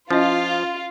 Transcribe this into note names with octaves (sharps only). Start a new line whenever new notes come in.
F3 C#4 E4 F4 D#5